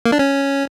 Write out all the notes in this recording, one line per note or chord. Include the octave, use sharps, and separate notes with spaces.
A#3
D4
C#4